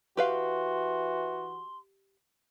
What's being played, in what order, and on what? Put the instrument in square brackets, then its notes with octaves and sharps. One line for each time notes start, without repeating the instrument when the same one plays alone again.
[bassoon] E3 [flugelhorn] F#4 [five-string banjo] G4 B4 F5 [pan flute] C6